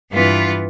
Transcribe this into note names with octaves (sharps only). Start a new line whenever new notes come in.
G2 E3 B3 F4